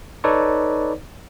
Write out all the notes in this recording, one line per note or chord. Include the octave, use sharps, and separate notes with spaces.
D#4 A4 B4 C#5 D5